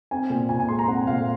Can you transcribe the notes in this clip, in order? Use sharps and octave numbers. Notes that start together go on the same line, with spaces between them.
C4 G#5
A#2
A#2 G#5
G#5
G#3 C6
A#5
C4 F#5
A#2 F5